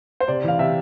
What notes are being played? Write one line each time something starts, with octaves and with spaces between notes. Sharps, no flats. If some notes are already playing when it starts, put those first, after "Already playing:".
C5
C3 D5
E3 F5
C3 E5